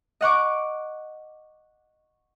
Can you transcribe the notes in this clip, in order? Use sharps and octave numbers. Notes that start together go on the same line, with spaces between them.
D#5 F#5 C#6 D6